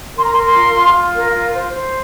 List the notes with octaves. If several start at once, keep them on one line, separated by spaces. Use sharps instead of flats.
A#4 C6
A#5
C6
A#4
C6
F4
F4
F4
A#4
F4
C5
C5